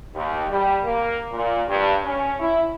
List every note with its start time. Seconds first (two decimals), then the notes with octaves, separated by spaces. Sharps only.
0.14 D#2
0.48 G3
0.84 A#3
1.32 A#2
1.68 G2
2.04 C#4
2.39 E4